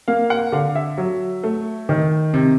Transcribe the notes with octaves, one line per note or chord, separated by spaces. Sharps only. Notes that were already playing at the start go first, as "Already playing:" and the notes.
A#3 F5
F#5
D3 F5
E5
F#3
A3
D#3
C3